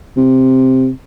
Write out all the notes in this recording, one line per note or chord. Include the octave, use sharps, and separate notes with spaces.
C3